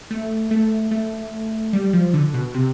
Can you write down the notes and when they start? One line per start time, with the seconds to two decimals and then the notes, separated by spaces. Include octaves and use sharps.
0.10 A3
0.51 A3
0.91 A3
1.73 G3
1.93 F3
2.14 D3
2.34 B2
2.54 C3